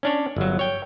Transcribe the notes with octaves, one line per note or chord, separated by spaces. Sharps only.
C#4 D4 C#5
G1 F#3
C#5 G5